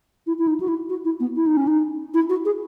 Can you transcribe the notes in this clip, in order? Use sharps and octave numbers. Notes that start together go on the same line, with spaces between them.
E4
E4
D#4
F#4
E4
F#4
E4
B3
E4
D#4
C#4
D#4
E4
F#4
G#4